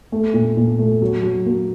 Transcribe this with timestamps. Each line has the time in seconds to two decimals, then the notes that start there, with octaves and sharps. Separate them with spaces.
0.12 A3
0.34 A#2
0.57 A#2
0.79 A3
1.02 F#3
1.23 F#3
1.46 A#3